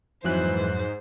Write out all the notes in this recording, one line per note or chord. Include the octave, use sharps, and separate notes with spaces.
F2 G#2 E3 F#3 C5 F#6